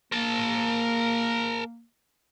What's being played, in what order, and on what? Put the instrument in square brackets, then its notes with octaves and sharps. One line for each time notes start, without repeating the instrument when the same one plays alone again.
[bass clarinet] A#3 [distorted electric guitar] A#4 A5